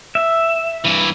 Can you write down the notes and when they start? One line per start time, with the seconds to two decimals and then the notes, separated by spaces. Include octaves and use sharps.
0.15 E5
0.85 G2 E3